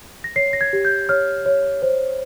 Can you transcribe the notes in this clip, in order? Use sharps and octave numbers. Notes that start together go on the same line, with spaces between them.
A#6
C#5 C7
A#6
G#6
G4
G6
C#5 F6
C#5
C5